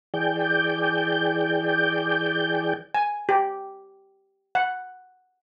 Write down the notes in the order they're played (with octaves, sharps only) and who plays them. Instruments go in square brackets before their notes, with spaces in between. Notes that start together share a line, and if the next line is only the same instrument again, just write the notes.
[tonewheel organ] E3 G#4 D5 G5 G6
[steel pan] G#5
G4
F#5